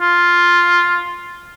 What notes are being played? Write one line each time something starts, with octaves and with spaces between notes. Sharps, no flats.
F4